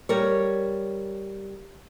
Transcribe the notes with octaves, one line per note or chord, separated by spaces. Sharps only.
G3 A#4 C#5